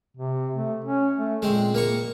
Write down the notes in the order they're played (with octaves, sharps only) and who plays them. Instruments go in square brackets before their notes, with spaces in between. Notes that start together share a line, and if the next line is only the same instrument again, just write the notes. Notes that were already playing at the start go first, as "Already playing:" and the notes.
[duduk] C3
A3
C#4
A3
[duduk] A#2 [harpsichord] G#3 C4
[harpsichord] A#3 A#5 C#6